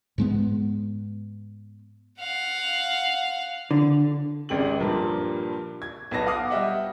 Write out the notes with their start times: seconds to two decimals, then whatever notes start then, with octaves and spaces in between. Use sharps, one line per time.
0.18 G#2 G#3 B3
2.20 F5 F#5
3.71 D3
4.49 G#1 C#2 G4 F#7
4.80 G2 A#2 F3 G3 A#3
5.82 G#6
6.11 B1 B3 A5 A#6
6.26 F5 F#5 D6 D#6 F6
6.50 G3 G4 D#5 E5 F#5